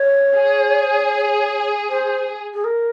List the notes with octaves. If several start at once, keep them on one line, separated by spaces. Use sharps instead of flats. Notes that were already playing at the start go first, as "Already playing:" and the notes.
Already playing: C#5
G#4
C5
G#4
A#4